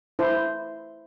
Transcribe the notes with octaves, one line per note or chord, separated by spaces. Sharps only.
E4 C5